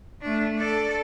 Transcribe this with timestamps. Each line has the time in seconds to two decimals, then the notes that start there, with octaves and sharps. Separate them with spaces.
0.22 A3 D4
0.56 A4 D5